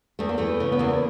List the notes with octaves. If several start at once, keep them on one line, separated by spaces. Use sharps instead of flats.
E2 A3
A#3
E3 A3
C#3
B3
E2 A#3